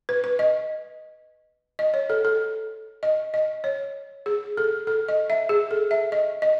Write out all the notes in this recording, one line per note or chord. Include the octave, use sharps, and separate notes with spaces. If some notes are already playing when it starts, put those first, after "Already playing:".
B4
B4
D#5
D#5
C#5
A4
A4
D#5
D#5
C#5
G#4
A4
A4
D#5
E5
G#4
A4
E5
D#5
D#5